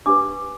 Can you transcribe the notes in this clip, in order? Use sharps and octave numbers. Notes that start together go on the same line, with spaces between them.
D4 G4 B4 D6